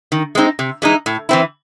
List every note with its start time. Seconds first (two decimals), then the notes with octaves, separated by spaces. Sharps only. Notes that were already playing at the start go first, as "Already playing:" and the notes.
0.12 D#3
0.35 G#3 C4 D#4
0.59 C3
0.82 E3 G#3 D#4
1.06 A2
1.29 E3 C4 E4